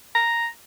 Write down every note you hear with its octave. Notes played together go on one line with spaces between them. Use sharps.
A#5